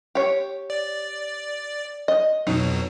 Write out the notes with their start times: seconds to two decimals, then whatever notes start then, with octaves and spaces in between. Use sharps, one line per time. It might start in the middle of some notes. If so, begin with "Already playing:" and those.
0.15 G4 C#5
0.70 D5
2.08 D#5
2.47 F2 B2 F#3 D#4